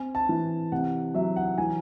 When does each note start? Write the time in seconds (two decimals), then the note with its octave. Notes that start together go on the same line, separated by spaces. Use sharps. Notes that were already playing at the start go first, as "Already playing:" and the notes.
Already playing: C4 G#5
0.15 A5
0.29 E3
0.72 C3 F#5
1.14 F#3 E5
1.36 F#5
1.58 E3 G#5